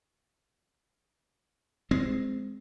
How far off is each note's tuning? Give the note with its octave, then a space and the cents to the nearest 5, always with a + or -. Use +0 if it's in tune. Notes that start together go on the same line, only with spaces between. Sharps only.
G#3 +0 C4 -10